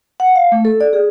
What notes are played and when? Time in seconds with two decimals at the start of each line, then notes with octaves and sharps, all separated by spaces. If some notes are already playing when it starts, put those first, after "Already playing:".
0.20 F#5
0.35 F5
0.52 A3
0.65 A4
0.81 D5
0.93 G#4